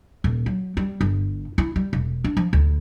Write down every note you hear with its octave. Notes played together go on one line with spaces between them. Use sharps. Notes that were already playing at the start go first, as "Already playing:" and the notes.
D#1
F#3
G3
G1
E4
G3
E1
D4
F3
D2